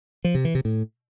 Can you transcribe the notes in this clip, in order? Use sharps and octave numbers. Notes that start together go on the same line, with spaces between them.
F3
C3
E3
C3
A2